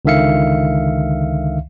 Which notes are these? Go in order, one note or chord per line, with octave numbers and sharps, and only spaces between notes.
C#2 D3 D#3 E5 F5 C#7